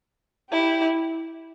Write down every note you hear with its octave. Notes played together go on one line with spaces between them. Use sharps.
E4 G4